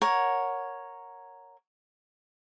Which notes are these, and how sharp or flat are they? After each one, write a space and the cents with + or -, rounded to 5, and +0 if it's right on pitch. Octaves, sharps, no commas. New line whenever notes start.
A#4 +0 C#5 +0 F#5 -10